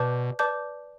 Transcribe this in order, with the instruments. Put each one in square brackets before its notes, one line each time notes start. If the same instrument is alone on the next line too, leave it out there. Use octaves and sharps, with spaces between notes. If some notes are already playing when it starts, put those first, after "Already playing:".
Already playing: [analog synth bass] B2 [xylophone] B4 D5 A5 D6 G6
[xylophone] B4 D5 A5 D6 G6